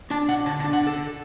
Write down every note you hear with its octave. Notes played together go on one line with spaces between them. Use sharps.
D4 A5
B2 F#5
D3 A5
A5
D4
F#5
D3 A4